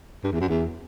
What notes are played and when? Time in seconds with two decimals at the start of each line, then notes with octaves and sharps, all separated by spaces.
0.24 G2
0.32 E2
0.40 F#2
0.49 E2